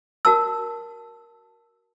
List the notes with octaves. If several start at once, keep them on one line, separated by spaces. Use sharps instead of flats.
F#4 A#4 A5 E6